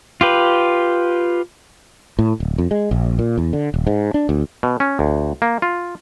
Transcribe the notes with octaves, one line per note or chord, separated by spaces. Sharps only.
F4 G4 B4
A2
D1
F2
G#3
A#1
A#2
E2
D3
D#1
G#2
D4
D2
B2
C#4
D2
A#3
F4